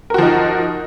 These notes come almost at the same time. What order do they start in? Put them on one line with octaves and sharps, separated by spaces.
A#4 F#4 F3 D#4